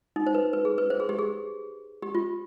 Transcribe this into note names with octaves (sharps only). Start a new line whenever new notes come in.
D#4
C5
B4
B4
G#4
B4
C5
G#4
G4
G#4
G4
F4